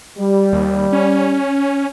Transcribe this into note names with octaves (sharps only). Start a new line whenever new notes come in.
G3
D#2
C#4